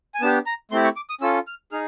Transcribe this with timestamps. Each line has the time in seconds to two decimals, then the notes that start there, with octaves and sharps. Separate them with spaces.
0.15 G#5
0.21 B3 D4 G4 A5
0.46 A#5
0.71 A3 C4 E4 G4 C6
0.84 C#6
0.96 D6
1.10 D#6
1.21 C#4 F4 A4 E6
1.47 F6
1.72 D#4 G#4 F6